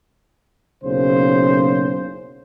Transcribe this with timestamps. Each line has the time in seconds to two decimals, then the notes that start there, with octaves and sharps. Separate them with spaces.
0.84 F#1 B1 C#3 C5